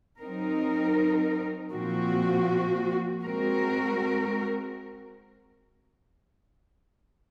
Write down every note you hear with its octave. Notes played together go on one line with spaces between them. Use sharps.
F#3 C4 D#4 A#4
A#2 F3 C4 F#4
G#3 C4 F#4 A#4